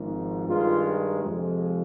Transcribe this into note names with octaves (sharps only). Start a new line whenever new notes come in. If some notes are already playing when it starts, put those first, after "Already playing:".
Already playing: G#1 G#2 F3
G2 D#3 G#3 F4
F2 C3 F3 G#3